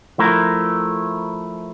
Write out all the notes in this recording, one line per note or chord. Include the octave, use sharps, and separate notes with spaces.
F3 A3 E4 A#4